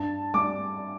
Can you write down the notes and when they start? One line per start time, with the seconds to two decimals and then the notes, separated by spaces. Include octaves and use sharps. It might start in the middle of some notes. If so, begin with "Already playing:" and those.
Already playing: G2 A5
0.34 G3 D4 D6